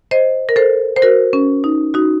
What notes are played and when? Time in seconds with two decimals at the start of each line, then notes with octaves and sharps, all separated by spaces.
0.11 C5 D#5
0.49 A#4
0.56 A4 C5
0.96 C5
1.02 F#4 A#4
1.33 C#4
1.64 D#4
1.94 D#4 F#4